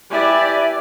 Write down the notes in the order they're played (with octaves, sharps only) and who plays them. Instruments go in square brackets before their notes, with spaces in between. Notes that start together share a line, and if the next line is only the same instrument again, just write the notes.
[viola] E4 B4 [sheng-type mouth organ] G4 G#5 [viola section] D5 [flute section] E5